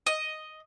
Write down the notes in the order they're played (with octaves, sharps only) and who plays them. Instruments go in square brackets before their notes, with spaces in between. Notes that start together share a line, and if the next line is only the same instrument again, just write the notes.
[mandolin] D#5